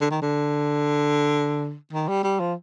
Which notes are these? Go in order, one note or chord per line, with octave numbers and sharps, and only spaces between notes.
D3
D#3
D3
D#3
G3
G3
F3